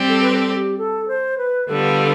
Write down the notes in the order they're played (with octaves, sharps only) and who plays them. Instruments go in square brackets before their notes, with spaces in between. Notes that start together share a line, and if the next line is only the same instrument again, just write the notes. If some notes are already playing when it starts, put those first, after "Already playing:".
Already playing: [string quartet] G3 C4 G4 D5
[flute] A4
B4
A4
G4
A4
C5
B4
[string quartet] D3 G3 B3 F4 [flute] A4